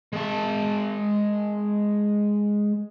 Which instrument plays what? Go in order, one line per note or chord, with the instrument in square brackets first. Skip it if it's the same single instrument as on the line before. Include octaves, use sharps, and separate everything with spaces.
[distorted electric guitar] G#3 A5